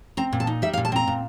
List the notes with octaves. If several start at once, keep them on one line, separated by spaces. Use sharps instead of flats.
C4 A#5
A#2
A5
D#4
G3 E5
F5
A#2
A5
C4 A#5
A#2